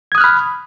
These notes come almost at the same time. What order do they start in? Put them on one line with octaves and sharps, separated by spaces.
G#6 D#6 F#6 F6 B5